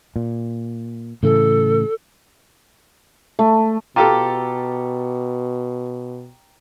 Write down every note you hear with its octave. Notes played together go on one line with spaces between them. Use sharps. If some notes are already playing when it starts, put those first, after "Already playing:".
A#2
A2 C#3 E3 A4
A3
B2 F4 G4 A4 G5 A#5 D6